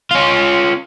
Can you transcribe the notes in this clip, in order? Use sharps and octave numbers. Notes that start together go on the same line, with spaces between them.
C#4 F4